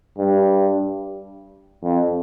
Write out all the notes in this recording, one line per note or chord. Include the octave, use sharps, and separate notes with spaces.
G2
F2